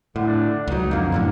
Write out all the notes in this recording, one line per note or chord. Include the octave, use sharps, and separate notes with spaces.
A2 D3
D4
C#2 F#3 D#4
F2 D3 A#3
F#2 A2 D3